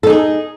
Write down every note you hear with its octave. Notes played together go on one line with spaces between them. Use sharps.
D#4 G#4 A4